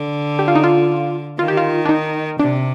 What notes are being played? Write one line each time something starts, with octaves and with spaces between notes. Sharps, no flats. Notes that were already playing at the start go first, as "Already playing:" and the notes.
Already playing: D3
G4
F4
D#4
F4
D#3 F4
G4
F4
D4
D#4
C3 D4